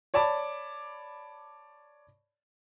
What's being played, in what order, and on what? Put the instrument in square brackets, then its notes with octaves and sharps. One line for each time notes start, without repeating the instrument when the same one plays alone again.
[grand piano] C#5 D5 A5 B5 D6